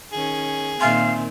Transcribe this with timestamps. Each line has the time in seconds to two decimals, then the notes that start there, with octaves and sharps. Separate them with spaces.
0.12 D#3 C#4 G#4
0.81 A#2 D#3 C4 E5 F5 G#5 C6